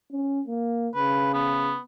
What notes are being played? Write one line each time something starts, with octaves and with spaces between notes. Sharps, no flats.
C#4
A#3
C#3 B4
B3